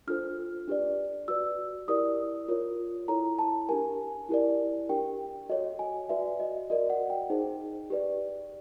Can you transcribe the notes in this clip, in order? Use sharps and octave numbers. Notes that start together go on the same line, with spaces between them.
D4 F4 A4 C5 F6
D4 G4 B4 D5
F#4 B4 D5 E6
E4 G4 A#4 D5 D#6
F4 A#4 C#5
E4 A4 C#5 A#5
A5
D4 G4 A#4 G#5
E4 G4 A#4 D5
D4 G4 A#4 G5
F#4 A4 C#5 D#5
G#5
F#4 B4 D5 E5
D#5
F#4 A#4 D5 D#5
F#5
G5
D#4 G#4 C5
G4 B4 D5